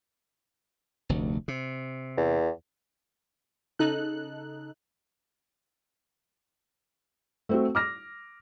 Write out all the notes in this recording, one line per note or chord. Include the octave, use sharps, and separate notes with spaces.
F1 D2
C3
E2
C#3 D#4 A4 F#6
A3 C4 F#4
D6 F6 A#6